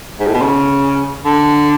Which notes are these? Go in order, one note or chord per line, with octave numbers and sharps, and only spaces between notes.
G#2
A2
B2
C#3
D3